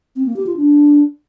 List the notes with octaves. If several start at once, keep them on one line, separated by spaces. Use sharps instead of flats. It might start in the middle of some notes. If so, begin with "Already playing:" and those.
C4
A#3
G4
F4
D4